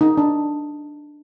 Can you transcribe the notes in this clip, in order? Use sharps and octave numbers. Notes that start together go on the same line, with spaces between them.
D#4
D4